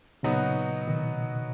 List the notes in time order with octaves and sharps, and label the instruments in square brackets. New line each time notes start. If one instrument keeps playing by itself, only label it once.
[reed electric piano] A#2 C#3 [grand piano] F#3 B3 D#4 F#4
[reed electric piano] B2 D#3